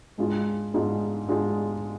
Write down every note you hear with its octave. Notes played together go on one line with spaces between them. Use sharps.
G#2 G#3 D4 F4
G#2 G#3 D4 F4
G#2 G#3 D4 F4